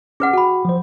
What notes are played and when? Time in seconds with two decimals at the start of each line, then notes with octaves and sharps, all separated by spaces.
0.20 C#4 G#4 B4 F#5
0.33 F#4 F#5 G5 B5
0.65 F3 C5